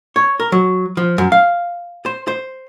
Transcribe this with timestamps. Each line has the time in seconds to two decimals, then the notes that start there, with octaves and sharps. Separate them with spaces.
0.16 C#5
0.40 A#4
0.52 F#3
0.97 F3
1.18 F#2
1.32 F5
2.06 C5
2.28 C5